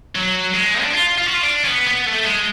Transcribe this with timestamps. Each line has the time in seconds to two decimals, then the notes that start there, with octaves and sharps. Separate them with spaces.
0.15 F#3
0.54 G#3
0.81 D4
0.93 F4
1.18 F4
1.26 F#4
1.34 F4
1.43 D4
1.64 C#4
1.68 B3
1.87 B3
2.07 A3
2.26 G#3